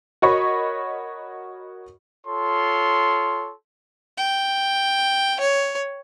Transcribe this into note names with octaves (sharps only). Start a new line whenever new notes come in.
F#4 A#4 C#5 D#5 B5 C#6
F4 A4 C#5 C6
G5
C#5